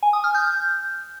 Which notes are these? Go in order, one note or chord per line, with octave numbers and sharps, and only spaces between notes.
G#5
D#6
F6
G6